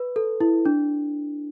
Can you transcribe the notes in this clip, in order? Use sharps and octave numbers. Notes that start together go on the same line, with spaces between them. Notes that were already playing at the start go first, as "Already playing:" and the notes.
Already playing: B4
A4
E4
D4